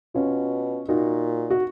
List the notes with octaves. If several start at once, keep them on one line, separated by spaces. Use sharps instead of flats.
B2 C#4 F4
A#2 D#4 F#4
F#4